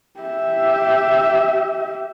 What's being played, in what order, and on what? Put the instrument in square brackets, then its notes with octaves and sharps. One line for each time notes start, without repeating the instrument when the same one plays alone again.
[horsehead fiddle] G4 E5